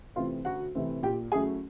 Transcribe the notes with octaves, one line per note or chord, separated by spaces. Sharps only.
C3 E3 A3 C4 F4 F5
D2 F#4 F#5
C3 E3 A3 C4
A#2 G4 G5
F#3 A3 C#4 E4 G#4 G#5